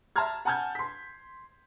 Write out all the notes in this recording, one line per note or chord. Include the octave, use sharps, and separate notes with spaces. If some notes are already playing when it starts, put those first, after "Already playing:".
E5 A5 A#5 C6 F6 G#6
F#5 G#5 A5 F6 G6 G#6
C6 B6